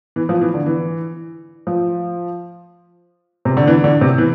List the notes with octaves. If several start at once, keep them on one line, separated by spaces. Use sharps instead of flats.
E3
F3
E3
D3
E3
F3
C3
D3
E3
D3
C3
E3